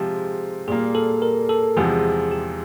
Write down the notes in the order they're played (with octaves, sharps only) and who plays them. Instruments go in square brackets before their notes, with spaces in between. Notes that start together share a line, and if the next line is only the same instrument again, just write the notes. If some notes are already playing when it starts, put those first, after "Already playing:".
Already playing: [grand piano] C3 F3 G#3 [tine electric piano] G4 G#4
[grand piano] A#2 G3 A#3 [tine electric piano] G#4
[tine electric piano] A4
A#4
A4
[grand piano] E2 C3 F3 G#3 [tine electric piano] G#4
[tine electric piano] G4